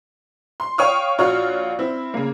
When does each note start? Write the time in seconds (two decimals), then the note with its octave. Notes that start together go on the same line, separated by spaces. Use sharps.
0.60 C6
0.78 C#5 F5 G5 C#6 D#6 F6
1.18 A#1 F4 F#4 C#5 F6
1.79 C4 E4
2.14 C#3 A#3